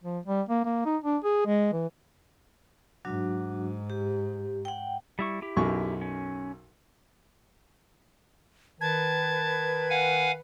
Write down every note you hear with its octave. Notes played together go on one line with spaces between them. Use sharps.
F3
G3
A#3
A#3
D#4
D4
G#4
G#3
E3
G#2 F#3 D4 F#4
G4
F#5 G5
G3 E4 C#6
E4 G4
B1 F#2 C#6
C#4
D#3 B4 A5 G#6
F5 F#5 G#5